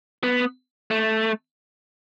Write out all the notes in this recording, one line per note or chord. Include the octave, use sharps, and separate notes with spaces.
B3
A3